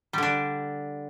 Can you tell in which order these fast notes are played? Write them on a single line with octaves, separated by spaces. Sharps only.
G3 D3 D4